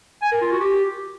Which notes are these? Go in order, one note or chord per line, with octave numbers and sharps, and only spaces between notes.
G#5
A#4
F4
F#4
G4